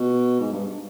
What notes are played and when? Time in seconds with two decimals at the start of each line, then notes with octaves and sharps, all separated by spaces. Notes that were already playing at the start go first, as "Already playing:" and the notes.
Already playing: B2
0.40 G#2
0.52 G2